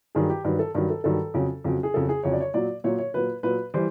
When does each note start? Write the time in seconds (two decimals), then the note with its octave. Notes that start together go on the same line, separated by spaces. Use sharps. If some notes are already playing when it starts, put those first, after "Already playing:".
0.15 G2 D#3 F#3 G#4
0.30 G4
0.44 G2 D#3 F#3 B4
0.59 A4
0.74 G2 D#3 F#3 A#4
0.90 A4
1.04 G2 D#3 F#3 A4
1.34 F2 C#3 F#3
1.64 F2 C#3 F#3
1.83 G#4
1.94 F2 C#3 F#3 A4
2.09 G#4
2.23 F2 C#3 F#3 C#5
2.33 D5
2.40 C#5
2.54 A#2 F#3 D5
2.84 A#2 F#3 C#5
2.98 C#5
3.14 A#2 F#3 B4
3.43 A#2 F#3 B4
3.74 E3 G3 C5